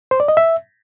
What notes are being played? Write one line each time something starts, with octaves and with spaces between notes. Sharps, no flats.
C5
D5
D#5
E5